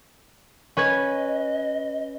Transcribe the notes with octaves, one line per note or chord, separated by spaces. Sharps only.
C#4 B4 D#5 G#6